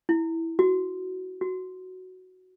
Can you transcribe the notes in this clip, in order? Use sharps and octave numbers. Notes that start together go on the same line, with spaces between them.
E4
F#4
F#4